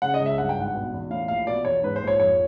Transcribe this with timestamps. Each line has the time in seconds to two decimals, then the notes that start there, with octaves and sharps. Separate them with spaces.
0.02 C#3 F#5
0.14 D#5
0.20 C#2
0.26 E5
0.38 G2 F#5
0.49 G5
0.57 G#1 F#5
0.74 B2
0.93 E2
1.10 A2 F5
1.28 A#1 F5
1.46 B2 D5
1.65 E2 C#5
1.83 G#2 B4
1.96 C5
2.02 A#1
2.07 C#5
2.20 F2 C#5